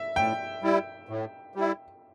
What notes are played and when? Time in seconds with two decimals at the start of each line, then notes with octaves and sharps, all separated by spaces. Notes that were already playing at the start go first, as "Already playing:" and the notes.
Already playing: E5
0.16 A2 G5
0.62 G3 E4
1.09 A2
1.55 G3 E4